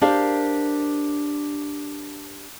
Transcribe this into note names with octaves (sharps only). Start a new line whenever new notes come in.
D4 G4 A#4 C5 F5